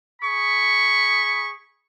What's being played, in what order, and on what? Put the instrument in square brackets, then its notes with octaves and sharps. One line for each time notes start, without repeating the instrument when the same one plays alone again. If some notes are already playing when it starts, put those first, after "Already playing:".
[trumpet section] G#4 B5 C#6